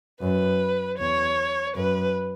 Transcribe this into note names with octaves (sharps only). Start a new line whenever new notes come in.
F#2 B4
E2 C#5
F#2 B4